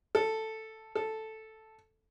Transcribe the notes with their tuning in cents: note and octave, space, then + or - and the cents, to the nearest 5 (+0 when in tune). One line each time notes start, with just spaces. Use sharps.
A4 +5
A4 +0